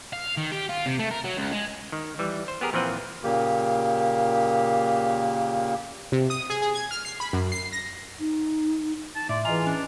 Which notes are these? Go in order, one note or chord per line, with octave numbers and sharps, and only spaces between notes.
F5
D#3
G4
F4
C3
A3
A#4
F#3
C#2
G#3
D#3
E3 G3
C5
B3 G4 G#4 A#4
A#2 E3 F3 C4 B4 F#5
A#2 C#3 A#3 G4
C3
D#6
G#4
G#4
G#6
F6
C7
B5
F#2
C7
A#6
D#4
A5
A2 D5 E5 C6
E3 F4 G#4 D#5 G#5 A#5
C#4 D4